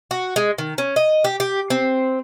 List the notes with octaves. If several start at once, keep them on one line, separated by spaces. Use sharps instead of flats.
F#4
G#3
D#3
C#4
D#5
G4
G4
C4